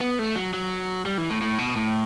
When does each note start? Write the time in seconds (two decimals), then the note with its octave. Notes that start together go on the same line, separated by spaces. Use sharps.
0.01 B3
0.19 A3
0.36 F#3
0.54 F#3
1.06 G3
1.18 E3
1.30 A2
1.42 A2
1.58 B2
1.76 A2